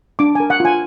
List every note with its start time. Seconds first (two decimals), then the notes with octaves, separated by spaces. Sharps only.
0.19 D4 D6
0.35 A#4 G#5
0.50 F#5
0.60 F4 G#5